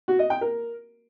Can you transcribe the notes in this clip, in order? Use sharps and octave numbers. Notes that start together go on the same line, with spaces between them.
F#4
D#5
G5
A#4